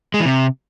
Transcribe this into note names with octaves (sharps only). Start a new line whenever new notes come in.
G#3
E3
C3